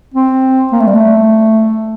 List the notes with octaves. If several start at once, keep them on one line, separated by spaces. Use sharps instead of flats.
C4
A#3
A3
G3
A3